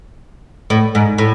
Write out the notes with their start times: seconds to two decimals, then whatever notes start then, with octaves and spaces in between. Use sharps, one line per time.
0.70 A2
0.95 G#2
1.18 A2